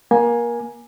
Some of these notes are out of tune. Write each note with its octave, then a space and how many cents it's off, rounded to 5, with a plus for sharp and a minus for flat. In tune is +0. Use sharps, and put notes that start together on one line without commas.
A#3 +25 G#5 +0